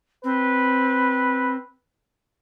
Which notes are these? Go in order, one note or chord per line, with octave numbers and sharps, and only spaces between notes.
C4 B4